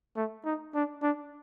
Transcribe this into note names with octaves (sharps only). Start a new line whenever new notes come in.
A3
D#4
D4
D4